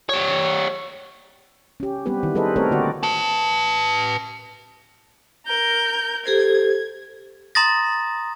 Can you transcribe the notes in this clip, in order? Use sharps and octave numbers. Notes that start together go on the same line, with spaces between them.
G3 C#5
C#4 G4
G3 B3 C4 G4 B4
D#3 E4
G3 G#4 A4 B4 C5 D#5
A3 C4 A4 A#4 C#5
D3 A#3 F#4 D5
B4 A5
A#4 G6
G4 A4 C5 G#6
A#5 C6 D#6 A6 A#6